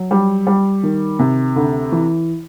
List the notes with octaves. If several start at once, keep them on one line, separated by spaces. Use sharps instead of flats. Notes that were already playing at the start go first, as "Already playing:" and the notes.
Already playing: F#3
G3
G3
D#3
C3
D2
E3